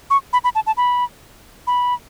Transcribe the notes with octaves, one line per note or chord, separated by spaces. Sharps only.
C#6
B5
B5
A5
A5
B5
B5